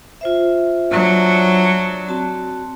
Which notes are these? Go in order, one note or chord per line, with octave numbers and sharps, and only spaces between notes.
F4 C5 E5
F#3 D4
C4 F#4 A5